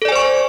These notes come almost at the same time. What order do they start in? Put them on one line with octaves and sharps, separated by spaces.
A4 D5 G#5 C5 C#6